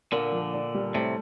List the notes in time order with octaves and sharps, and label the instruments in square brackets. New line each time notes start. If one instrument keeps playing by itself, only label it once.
[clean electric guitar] A#2 D3 [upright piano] A#3
[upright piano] F3
D4
G3
[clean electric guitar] A2 C3 [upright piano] A3